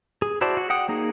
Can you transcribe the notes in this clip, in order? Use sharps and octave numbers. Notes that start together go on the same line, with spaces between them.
G#4
E4 F#4 C5 D5 A5
F#4
F#5 G5 D#6
A#3 D#4 G#4